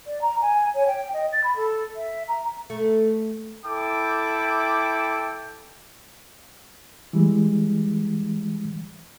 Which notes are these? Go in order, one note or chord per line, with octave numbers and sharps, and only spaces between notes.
D5
A#5
G#5
C#5
G5
D#5
A6
B5
A4
E5
A#5
A3
E4 A4 G5 D6
E3 G3 G#3